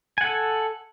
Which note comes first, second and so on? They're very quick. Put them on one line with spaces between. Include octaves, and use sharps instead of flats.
G#5 F#5 A4